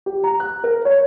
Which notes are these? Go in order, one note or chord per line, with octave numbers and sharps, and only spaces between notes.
G4
A#5
F#6
A#4
C#5